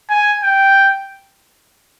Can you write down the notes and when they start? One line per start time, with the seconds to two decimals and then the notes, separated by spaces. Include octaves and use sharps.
0.10 G#5
0.44 G5